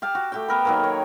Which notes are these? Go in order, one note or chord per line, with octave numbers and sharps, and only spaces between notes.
G4 F5 A5
F#4
A3 G4 G5
B3 A#4 B4
D#3 F#3 A#3
C#5